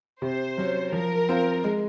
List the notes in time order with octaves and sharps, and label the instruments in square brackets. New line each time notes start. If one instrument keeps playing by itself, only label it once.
[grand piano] C3 [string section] C5
[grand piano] F#3 C#4
[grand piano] F3 [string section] A#4
[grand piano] C4 F4 C5
G#3